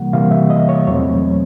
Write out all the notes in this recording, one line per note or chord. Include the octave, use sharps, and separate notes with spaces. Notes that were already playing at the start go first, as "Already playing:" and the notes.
Already playing: C3 E3 G3 A#3 F#5
C3 E3 G3 A#3 F5
E5
D#5
C#5
E2 B2 F#3 A3 C4 C#5